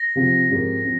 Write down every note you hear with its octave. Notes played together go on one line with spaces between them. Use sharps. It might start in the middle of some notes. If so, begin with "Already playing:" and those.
Already playing: A#6
C3 F3 C4
G#2 F3 C4 G4 A#4
F3 C4